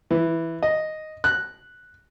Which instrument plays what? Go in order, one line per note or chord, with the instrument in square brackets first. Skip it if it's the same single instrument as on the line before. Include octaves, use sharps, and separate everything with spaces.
[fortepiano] E3
D#5
F#6